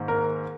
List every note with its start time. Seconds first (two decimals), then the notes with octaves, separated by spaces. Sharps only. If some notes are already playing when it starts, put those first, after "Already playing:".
Already playing: G#2 D#3 A#3
0.08 A#4